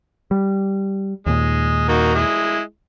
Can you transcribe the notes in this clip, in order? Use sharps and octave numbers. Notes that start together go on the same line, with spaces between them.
G3
D#2 A#2 G#3
A#3 D#4 F#4
G#3 E4